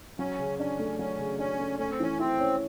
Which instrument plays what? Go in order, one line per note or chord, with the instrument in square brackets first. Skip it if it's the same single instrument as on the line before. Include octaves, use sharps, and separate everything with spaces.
[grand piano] F#3 [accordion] C#4
[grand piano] C#3
[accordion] C#4 [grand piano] D4
[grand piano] A3
[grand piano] F#3 [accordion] C#4
[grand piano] C#3
[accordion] C#4 [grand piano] D4
[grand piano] A3
[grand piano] A3 [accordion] C#4
[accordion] C4
[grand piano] E3 [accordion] C#4
[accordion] C4 [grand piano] E4
[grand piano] C#4